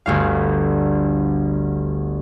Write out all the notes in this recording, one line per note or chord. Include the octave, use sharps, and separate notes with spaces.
G1 D2 F5